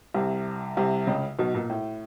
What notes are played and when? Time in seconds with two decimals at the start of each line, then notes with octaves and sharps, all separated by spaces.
0.14 C2 C3
0.77 C2 C3
1.07 C#2 C#3
1.39 B1 B2
1.54 A#2
1.69 A2